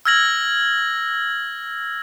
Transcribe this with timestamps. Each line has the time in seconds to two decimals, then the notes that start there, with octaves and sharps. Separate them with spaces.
0.05 E6 F6 G#6 A#6 F#7